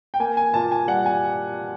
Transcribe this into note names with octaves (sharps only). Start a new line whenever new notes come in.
G5
A#3 G#5
G#5
A#2 A5
G#5
G3 F#5
G#5